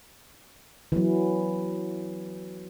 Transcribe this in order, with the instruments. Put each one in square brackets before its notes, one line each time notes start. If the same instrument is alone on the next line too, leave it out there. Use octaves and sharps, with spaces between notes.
[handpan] E3 F#3